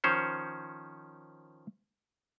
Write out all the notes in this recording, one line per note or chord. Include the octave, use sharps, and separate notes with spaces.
D#3 F3 C#4 C5 C#5